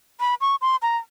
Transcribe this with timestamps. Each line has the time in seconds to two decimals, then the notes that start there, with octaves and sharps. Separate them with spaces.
0.20 B5
0.41 C#6
0.62 C6
0.82 A#5